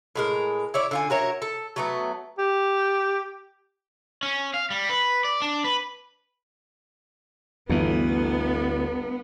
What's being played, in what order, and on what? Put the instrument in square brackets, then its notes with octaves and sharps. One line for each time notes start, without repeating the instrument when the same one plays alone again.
[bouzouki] A2 G#3 A#4
E4 C#5 D5 E5
D3 F4 G#5
F#4 A#4 C#5 E5
A4
F#3 A3 B3
[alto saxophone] G4
[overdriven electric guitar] C#4
F5
G3
B4
D5
D4
B4
[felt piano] G1 [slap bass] D2 E3 [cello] B3